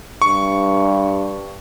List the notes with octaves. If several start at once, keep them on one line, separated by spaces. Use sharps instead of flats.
G2 C#6